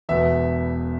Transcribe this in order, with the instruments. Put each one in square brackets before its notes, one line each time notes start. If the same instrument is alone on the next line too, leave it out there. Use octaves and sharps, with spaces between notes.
[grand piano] E1 E2 B2 B3 E5